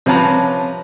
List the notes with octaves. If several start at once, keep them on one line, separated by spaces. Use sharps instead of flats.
C3 F3 C#4 B4 A5 A#5